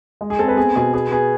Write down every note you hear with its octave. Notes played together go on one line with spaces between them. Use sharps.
G#3
G#4
C4 A4
B4
B3 G#4
B2 G#4
B3 G#4
B3 G#4